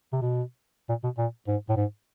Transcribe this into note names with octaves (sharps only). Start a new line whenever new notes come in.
C3
B2
A#2
B2
A#2
G#2
A2
G#2